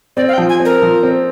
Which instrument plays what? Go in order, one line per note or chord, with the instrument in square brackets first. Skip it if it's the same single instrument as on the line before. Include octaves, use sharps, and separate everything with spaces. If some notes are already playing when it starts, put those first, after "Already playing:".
[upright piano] C4 [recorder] D5
[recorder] F5
G5
[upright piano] F3
[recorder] G#5
[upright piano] C4
[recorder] A#4
[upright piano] F3
C4